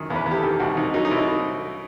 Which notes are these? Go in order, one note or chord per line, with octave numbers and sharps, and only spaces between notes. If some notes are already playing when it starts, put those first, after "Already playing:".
Already playing: F#2 D#3
E2
B4
E2
G4
A4
D#3
C2 F#4
C2 D#4
F#3 D#4
D#4
C2 E4